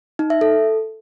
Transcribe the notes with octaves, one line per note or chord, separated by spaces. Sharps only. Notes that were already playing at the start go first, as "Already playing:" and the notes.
D#4
E5
A4